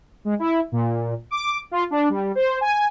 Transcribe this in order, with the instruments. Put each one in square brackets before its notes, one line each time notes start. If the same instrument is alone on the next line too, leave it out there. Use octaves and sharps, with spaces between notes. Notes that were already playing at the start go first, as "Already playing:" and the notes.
[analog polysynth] G#3
E4
A#2
D6
F4
D4
G3
C5
G#5